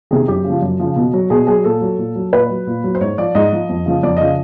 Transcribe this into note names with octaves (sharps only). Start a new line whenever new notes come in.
C3 D#3 G#4
F#2 G4
C#3
F3
F#2
C#3 F3
B2
F#3
B2 G#4
F#3 G#4
A#2 A4
F#3
A#2
F#3
A#2 B4
F#3
A#2
F#3
C5
G#2 C#5
F3 D5
G#2 D#5
F3
F2
C#3 F3
F2 D5
C#3 F3 D#5